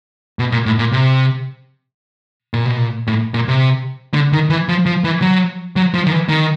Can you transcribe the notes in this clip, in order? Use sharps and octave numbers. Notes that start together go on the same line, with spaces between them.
B2
A#2
A2
A#2
C3
A#2
B2
A#2
A2
A#2
C3
D3
D#3
E3
F3
F3
E3
F#3
F#3
F3
D#3
E3
D#3